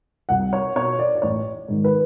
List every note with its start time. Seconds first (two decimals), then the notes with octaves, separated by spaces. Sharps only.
0.29 C2 F#5
0.53 C#5
0.76 B2 C#5
0.99 D5
1.15 D5
1.22 A1 C#5
1.68 G#2 D#3
1.84 B4